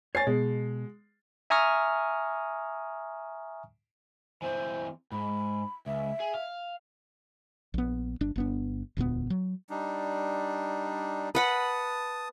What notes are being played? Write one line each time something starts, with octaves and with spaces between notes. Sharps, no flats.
C#5 G#5 A6 C7
B2 G#3
E5 G#5 A#5 C#6 D#6 F6
E3 C4 C5
G#2 B5
C#2 E5
G#4
F5
A#1 B3
G1 D4
G1 B3 D4
E1 D2 A#2 B3
F#3
G3 D4 D#4
B4 F#5 A5 B5 D#6